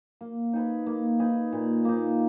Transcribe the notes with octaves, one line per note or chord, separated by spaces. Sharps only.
A#3
D#4 G#4 B4
A#3
D#4 G#4 B4
A#2
A#3 D#4